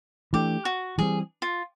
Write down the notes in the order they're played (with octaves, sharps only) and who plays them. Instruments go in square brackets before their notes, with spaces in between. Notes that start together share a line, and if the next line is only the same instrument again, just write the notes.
[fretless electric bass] E3 A3 D4 [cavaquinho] G4
[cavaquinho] F#4
[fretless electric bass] E3 G3 C4 [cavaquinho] G#4
[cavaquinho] F4